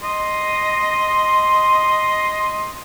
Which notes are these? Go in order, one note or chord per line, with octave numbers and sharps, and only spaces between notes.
D#5 C6